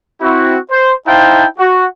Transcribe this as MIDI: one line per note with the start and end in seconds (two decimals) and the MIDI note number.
0.21 0.57 60
0.21 0.57 64
0.21 0.57 66
0.71 0.92 72
1.07 1.45 63
1.07 1.45 64
1.07 1.45 72
1.07 1.45 77
1.07 1.45 79
1.07 1.45 81
1.58 1.85 66